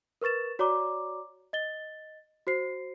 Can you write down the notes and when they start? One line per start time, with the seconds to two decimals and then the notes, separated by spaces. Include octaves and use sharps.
0.22 A#4 B4 C#6 A6 E7
0.59 F#4 C#5 D5 A#5 D6
1.53 D#5 A6 G7
2.47 F#4 C5 C7